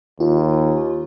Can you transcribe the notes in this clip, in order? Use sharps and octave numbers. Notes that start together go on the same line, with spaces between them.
D#2 F4